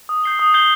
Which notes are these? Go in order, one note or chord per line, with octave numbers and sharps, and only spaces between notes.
D#6
G6 C7 G7
D#6
G6 C7 G7